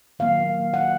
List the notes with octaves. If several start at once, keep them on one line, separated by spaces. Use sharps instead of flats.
D#3 F#3 A#3 F5
F#5